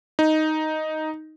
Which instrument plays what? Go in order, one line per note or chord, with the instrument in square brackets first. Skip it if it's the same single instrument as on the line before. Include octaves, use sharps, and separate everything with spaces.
[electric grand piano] D#4